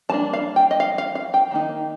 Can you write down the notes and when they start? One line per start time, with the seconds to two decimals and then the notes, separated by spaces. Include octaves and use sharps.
0.09 G3 A5
0.12 A#3 D4
0.33 F5
0.56 G5
0.71 D#5
0.80 F5
0.98 F5
1.15 F5
1.34 G5
1.51 D#3 A#3 D#4